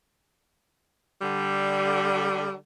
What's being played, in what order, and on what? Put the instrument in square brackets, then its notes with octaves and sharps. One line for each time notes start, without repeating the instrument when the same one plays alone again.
[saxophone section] D3 G3